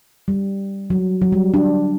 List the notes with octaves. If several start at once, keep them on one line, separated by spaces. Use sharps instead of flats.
G3
F#3
F#3
G3
D4